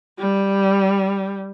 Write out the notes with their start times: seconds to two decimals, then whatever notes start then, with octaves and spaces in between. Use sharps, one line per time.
0.19 G3